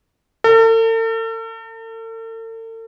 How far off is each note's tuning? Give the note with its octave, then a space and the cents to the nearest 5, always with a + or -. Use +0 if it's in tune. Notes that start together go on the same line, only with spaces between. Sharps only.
A4 +45